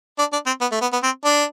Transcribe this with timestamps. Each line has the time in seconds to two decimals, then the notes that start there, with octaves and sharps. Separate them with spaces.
0.19 D4
0.33 D4
0.46 C4
0.61 B3
0.72 A3
0.81 B3
0.93 B3
1.03 C4
1.25 D4